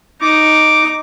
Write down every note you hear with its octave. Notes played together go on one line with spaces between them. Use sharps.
D#4 D6